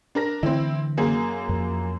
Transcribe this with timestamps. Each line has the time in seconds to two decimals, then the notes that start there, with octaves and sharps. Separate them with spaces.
0.15 D4 A#4 A#6
0.43 D3 E3 A3 C4 E4
0.97 F#2 A#3 G#4
1.49 F2